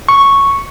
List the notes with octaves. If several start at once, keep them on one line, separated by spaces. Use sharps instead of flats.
C#6